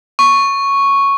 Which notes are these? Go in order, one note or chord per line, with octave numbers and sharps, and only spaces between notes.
C#6